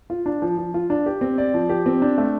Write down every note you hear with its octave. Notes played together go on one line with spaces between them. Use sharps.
F4
D4
F3
F3
F4
D4
G4
C4
D5
F3
G4
C4
D4
A3